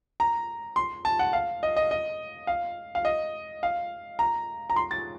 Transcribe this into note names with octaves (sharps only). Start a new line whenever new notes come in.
A#5
C6
A5
F#5
F5
D#5
D#5
D#5
F5
F5
D#5
F5
A#5
A#5
C6
A6